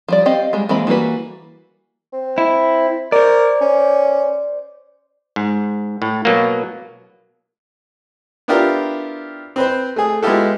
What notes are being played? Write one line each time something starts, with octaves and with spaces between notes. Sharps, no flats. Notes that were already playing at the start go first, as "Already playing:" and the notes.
F3 G3 D5
C4 G4 D#5 F5
G3 G#3
E3 G#3 A#3 C4 B5
E3 G3 A#3 F#4 B4
C4
E4
A#4 C5 D5
C#4
G#2
A2
B2 F#3 A#3
B3 D4 E4 F4 G4 A#4
C4 B4 C5
A3 G#4
G#3 B3 E4 F4 G4 A4